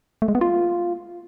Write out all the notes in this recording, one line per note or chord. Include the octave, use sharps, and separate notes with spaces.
A3
G#3
B3
F4